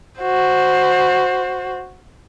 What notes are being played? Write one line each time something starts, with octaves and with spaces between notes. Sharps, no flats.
F#4 C5